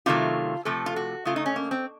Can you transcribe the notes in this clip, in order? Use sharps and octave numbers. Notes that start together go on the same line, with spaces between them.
C3 D#3 F#3 A3 F4
C3 F3 A3 A4
F4
F#4
C#3 A3 F4
D#4
C#4
A#3
C4